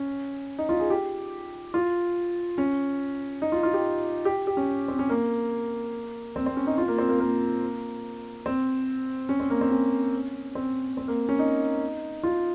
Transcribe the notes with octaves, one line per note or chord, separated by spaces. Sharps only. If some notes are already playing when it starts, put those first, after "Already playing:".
Already playing: C#4
D#4
F4
G#4
G4
F4
C#4
D#4
F4
F4
G4
G4
G4
C#4
C4
C#4
A#3
C4
C4
C#4
D#4
F4
A#3
C4
A#3
A#3
C4
C#4
C4
A#3
C4
C#4
C4
C4
A#3
C#4
D#4
F4